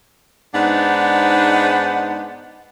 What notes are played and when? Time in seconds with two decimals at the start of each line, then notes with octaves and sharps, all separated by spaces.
0.55 G#2 B3 D4 D#4 C5 F#5